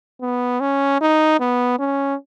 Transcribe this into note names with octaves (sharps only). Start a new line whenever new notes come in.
B3
C#4
D#4
B3
C#4